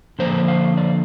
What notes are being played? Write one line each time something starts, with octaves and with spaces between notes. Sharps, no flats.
D3 F3 A#3 D4 C5
F5
D5